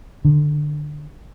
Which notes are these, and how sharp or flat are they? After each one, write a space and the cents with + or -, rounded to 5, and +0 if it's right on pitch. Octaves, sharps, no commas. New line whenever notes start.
D3 +15